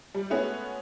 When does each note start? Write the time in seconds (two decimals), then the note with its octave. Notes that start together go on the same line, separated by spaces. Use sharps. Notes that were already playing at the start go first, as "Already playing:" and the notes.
0.14 G3
0.30 G#3 A3 B3 C#4 F#4 G#4